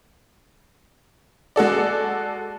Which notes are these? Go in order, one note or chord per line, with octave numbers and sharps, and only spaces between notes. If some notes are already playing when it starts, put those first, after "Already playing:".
G#3 F#4 A4 D5